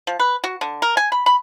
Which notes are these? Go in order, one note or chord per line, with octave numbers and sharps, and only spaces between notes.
F3
B4
F#4
D3
A#4
G#5
B5
B5